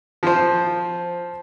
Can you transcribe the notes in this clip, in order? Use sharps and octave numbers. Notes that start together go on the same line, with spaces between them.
F3 C5